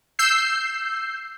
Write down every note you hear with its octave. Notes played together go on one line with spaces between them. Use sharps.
E6 G6 C7